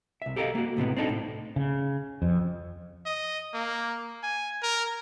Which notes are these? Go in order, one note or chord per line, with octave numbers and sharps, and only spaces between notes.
C2 E5
G4 A4 A#4 D5 D#5 F5
A#3 F#4
C#2 A2 C3 B3
C4 D4 D#4 A4
A2
C#3
F2
D#5
A#3
G#5
A#4